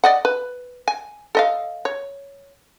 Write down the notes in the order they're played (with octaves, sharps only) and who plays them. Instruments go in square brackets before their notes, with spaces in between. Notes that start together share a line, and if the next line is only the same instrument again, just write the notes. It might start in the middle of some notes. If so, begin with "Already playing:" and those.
[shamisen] D5 D#5 F#5
B4
G#5
A4 D#5 F5
C#5